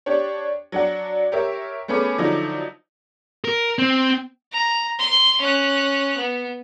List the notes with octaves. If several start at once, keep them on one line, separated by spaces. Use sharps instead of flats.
D4 G4 C#5
F#3 D4 F#5
G4 A#4 C#5 E5
A3 B3 C#4 G#4 B5 D6
D3 F3 F#3 D#4 E4
A#4
C4
A#5
C6
C#4 F#6
B3